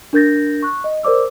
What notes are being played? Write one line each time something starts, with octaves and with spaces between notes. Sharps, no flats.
D4 A#4 G6 A6 A#6
C#6 F#6
D#5
A#4 C5 D5 D6 E6